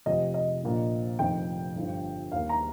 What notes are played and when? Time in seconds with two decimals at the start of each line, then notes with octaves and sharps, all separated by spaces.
0.06 F1 F2 C3 F3 D#5
0.34 D#5
0.63 A#1 A#2 F3 A#3
1.19 F1 F2 D#3 G5
1.75 G1 G2 F3
2.32 D#2 D#3 A#3 F5
2.49 A#5